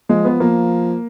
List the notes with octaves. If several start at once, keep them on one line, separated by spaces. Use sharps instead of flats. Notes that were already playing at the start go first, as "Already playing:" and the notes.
F3 G#3
B3
F3 A#3